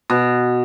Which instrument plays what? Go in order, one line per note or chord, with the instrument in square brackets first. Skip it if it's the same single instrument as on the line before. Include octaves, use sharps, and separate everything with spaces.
[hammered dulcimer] B2